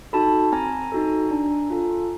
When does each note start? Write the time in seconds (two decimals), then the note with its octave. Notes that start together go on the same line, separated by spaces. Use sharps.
0.13 D#4 F#4 A4 A5 B5
0.52 C4 G#5 A#5
0.92 D#4 F#4 A4
1.31 D4
1.70 F4 A4